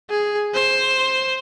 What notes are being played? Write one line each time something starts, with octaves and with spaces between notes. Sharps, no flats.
G#4
C5